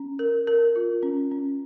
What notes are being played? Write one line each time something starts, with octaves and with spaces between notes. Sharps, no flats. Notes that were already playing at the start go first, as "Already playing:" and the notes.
Already playing: C#4
A#4
A#4
F4
C#4
C#4